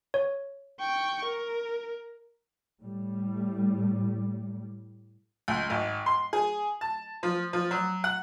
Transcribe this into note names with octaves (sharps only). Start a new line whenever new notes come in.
C#5
G5 C#6
A#4
A2 G3
C#2
G#1
C6
G#4
A5
F3
F3
F#3
F#5